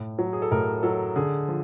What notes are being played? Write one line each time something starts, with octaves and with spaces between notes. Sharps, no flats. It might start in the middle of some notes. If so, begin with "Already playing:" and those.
Already playing: A2
F#3
G#4
A4
A2 A#4
F#3 A4
D3 G#4
F3